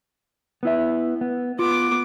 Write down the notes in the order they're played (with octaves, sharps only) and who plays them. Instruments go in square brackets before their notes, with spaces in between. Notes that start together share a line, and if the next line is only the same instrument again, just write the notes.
[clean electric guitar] B3 E4 E5
B3
[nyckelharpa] B3 D6 [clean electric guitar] F4